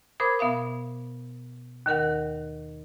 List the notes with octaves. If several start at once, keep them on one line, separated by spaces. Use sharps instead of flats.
A#4 C5 B5 D6 D#6 G#6
B2 B3 E5 F5 D#6
D#2 D#3 A#4 F#5